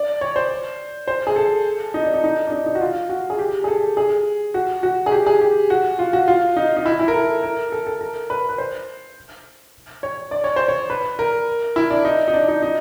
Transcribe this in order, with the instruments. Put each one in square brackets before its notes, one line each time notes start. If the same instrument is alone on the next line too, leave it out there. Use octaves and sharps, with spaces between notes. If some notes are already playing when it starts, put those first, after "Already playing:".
Already playing: [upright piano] D5
C#5
C5
C5
G#4
A4
D#4
D4
D#4
D#4
D4
D#4
D#4
F#4
F4
F#4
G#4
G4
G#4
A4
G#4
F#4
F#4
G#4
G4
G#4
G4
F#4
F4
F#4
F4
D#4
D#4
E4
E4
A#4
A4
A#4
A4
A4
A#4
B4
B4
C5
C#5
D5
C#5
C5
C#5
B4
A#4
E4
D4
D#4
D#4
D4
D#4
D#4